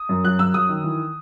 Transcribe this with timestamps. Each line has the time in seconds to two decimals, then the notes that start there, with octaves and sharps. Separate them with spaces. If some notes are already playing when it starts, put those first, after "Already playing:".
Already playing: D#6
0.09 F#2
0.24 F#3 F#6
0.39 F#2 E6
0.54 F#3 D#6
0.69 D#3
0.84 E3